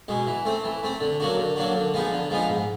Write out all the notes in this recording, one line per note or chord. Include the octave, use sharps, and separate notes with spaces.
B2 G#3
E3
A3 C4
E3
A3 C4
D3
F#3 A#3 D4 F#4
D3
F#3 A#3 D4 F#4
D3
F3 G#3 B3 D#4
D3
F3 G#3 B3 D#4
G#2